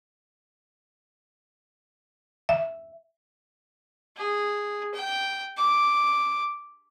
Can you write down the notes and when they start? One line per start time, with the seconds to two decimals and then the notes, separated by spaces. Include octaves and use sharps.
2.49 E5
4.17 G#4
4.94 G5
5.57 D6